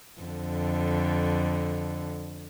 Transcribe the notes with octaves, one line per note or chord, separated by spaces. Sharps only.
F2 D3